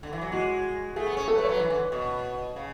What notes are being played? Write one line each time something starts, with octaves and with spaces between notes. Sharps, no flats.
D3
E3
F#3
G#3 F#4
A3 G#4
B3
C#4
A4
A3 B4
C#5
F#3 B4
E3
D3
B2
C#3